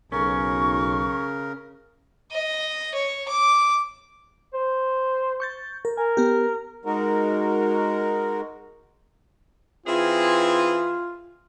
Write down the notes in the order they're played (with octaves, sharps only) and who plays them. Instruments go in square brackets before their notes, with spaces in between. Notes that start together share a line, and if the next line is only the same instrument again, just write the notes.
[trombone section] B1 [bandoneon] C#3 A#4 [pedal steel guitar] C#4 [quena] C#6
[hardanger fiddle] D#5
C#5
D6
[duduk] C5
[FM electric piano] C#6 G6 A6
A#4
[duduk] A#4 [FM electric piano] G#5
[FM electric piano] B3 G4
[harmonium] G#3 D#4 F#4 A#4
[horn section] E3 C4 G#4 [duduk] F4